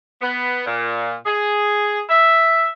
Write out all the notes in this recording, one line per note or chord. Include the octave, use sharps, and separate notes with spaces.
B3
A#2
G#4
E5